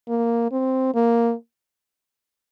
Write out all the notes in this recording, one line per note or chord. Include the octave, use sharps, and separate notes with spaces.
A#3
C4
A#3